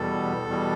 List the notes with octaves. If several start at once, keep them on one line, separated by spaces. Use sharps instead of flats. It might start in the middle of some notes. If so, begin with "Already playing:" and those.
Already playing: E2 B2 G3 A4
E2 B2 G3